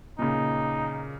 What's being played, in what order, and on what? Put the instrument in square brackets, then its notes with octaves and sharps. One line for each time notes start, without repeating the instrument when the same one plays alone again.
[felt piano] A#2 C#3 [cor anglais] D#4